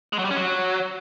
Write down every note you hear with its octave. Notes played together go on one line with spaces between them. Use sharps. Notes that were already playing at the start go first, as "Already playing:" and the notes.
G#3
F#3
G3
C#4
F#3